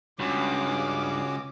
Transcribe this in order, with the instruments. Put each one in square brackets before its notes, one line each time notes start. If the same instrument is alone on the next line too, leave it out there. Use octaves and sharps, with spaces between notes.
[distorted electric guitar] C#2 [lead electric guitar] G2 [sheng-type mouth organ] C#4 F#4 [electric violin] D6 D#6